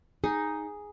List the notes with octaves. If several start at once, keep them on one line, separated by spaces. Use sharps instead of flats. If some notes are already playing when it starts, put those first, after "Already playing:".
D#4 G#4